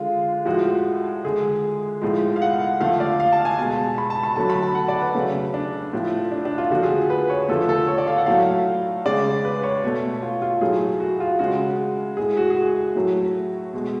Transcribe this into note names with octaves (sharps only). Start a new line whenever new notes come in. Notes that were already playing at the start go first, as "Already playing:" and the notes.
Already playing: D3 G#3 F4
A2 F3 G#3 F#4
D3 G#3 G#4
A2 F3 G#3
F5
F#5
D3 F3 A3 F5
D5
F5
A5
G#5
B2 G#3 A5
B5
A5
B5
D3 F#3 A3 A5
B5
A5
F#5
D5
B4
C#3 F#3 A3
D4
A2 F3 A3
D4
D4
F4
D3 F3 A3 F#4
G#4
B4
C#5
D3 F3 A3 A4
A4
C#5
D5
F5
F#5
A2 F#3 A3 F5
C#3 G#3 D5
B4
C#5
B2 A3
F4
F4
A2 F#3 A3 G#4
F#4
F4
C#3 G#3 F#4
A2 G#3 G#4
F#4
G#4
F#4
A2 F#3 A3
B2 G#3